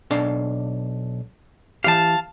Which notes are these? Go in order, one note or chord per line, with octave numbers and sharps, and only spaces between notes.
B1 D4 F5
E3 G4 F5 A5